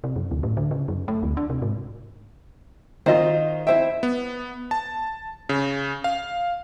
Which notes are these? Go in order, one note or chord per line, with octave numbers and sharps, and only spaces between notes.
C3
F#2
D2
A2
D3
C#3
F#2
A3
D2
D4
C3
G#2
D#3 F4 C5 D#5
E4 C5 E5 G5
B3
A5
C#3
F5